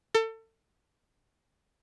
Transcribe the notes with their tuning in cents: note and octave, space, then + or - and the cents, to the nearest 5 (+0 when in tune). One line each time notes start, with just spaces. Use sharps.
A4 +30